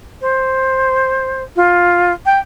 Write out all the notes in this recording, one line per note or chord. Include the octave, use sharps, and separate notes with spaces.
C5
F4
G5